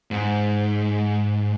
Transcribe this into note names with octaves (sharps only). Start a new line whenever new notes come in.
G#2